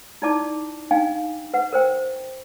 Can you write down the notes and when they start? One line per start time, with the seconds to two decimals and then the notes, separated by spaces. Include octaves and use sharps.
0.22 D#4 E4 D5 A5 D6
0.91 D4 D#4 F5 G5 G#5
1.54 B4 F#5
1.73 A#4 C5 G5